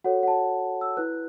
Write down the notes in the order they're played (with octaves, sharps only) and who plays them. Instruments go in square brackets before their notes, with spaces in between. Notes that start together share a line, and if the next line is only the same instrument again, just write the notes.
[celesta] F#4 A4 C#5 F#5
F#5
A5
E6
E4 B4 F#6